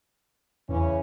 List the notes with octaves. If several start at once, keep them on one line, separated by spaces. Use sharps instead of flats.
E2 C#3 E3 C#4